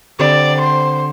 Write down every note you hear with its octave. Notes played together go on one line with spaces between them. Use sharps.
D3 C4 G4 D5
C5